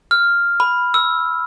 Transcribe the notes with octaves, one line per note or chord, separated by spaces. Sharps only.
F6
B5
E6